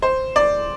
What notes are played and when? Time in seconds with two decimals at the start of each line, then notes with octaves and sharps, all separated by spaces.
0.02 C5
0.36 D5